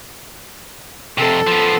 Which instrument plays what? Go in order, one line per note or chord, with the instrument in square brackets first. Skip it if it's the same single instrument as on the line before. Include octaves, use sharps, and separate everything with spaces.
[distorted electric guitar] F2 C3 [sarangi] A4
[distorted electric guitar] F3 B3